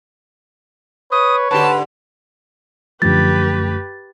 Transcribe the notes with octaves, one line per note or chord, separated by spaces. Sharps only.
B4 C#5 D#6
G#2 D3 G4 B4 A5
F#2 D3 F3 A3 G4 B4 A6